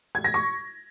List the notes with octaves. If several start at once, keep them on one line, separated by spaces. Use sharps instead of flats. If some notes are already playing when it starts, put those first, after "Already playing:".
G#6
A#6
C#6